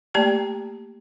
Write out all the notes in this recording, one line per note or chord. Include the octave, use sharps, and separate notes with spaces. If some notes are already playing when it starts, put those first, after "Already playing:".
A3 A#3 G4 D5 A5 A#5